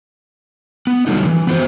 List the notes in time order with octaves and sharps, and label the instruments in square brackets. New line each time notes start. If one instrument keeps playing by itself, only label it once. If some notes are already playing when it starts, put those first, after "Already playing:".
[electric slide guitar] B3
D3 F#3 G3 A3 D#4
E3
B3 C4 F#4 C5